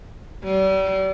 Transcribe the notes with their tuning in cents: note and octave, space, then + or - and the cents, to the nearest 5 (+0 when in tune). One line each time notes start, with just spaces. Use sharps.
G3 -35